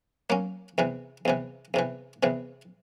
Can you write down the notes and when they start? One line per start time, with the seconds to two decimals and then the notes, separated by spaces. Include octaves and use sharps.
0.30 F#3 A#3 C#4
0.78 E2 C3 E3
1.25 E2 C3 E3
1.74 E2 C3 E3
2.23 E2 C3 E3